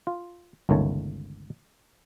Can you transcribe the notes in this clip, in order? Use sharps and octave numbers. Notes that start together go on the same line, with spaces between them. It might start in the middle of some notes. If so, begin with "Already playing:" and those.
F4
G1 C#2 D#3 A3 C#5 A5